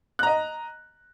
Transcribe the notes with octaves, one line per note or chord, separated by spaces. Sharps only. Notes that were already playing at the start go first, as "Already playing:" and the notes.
D#5 A#5 F#6